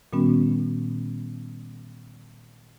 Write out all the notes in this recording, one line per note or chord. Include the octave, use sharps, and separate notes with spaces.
A#2 D#3 G3 B3 C#4 F#4